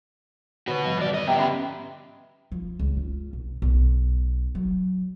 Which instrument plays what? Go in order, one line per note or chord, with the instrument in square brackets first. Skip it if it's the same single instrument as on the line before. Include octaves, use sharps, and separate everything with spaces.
[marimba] D3 D#3 [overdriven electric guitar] F#4 B4
[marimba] G#2 F3 G3
[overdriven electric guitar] E2 D5
F2 D#5
[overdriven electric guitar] B3 G4 [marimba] E5 G5 A#5
[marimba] C#4 E5 B5
[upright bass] F3
C#2
F4
B1
B1
F#3